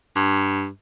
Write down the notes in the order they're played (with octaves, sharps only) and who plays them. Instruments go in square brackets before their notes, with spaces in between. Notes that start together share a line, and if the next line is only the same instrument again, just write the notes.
[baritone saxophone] G2